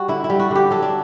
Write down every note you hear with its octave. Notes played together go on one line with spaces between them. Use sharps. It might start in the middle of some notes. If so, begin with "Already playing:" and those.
Already playing: G3 F#4
D3 E4
E4
G3
F#4
D3 G4
F#3 A4
D4